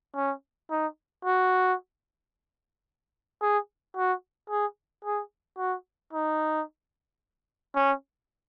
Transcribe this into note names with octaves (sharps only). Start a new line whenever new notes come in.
C#4
D#4
F#4
G#4
F#4
G#4
G#4
F#4
D#4
C#4